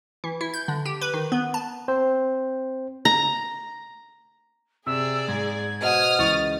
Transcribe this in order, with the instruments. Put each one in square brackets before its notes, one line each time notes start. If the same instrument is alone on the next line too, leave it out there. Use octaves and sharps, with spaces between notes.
[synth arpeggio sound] E3
E4
G6
D3
G4
B4
D#3
B3
A5
[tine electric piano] C4 C5
[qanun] A#5
[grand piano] C3 [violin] G#4 D5 [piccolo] E6
[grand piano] G#2 [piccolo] G#6
[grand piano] B2 [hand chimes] C5 D#5 F#5 [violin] D#6 F6
[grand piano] C#2 E3 C#6 [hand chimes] D#5 [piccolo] A6